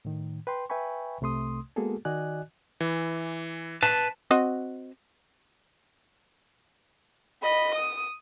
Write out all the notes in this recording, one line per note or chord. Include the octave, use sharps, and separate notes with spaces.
A2 D#3
B4 G5 C6
B4 E5 G5 G#5 B5 C#6
C2 C3 A3 C6 D#6
G#3 A#3 B3 F#4 G#4 A4
D#3 F#4 D5 D#5 G#5 F#6
E3
B4 A5
C4 F#4 D#5
D#5 B5
D#6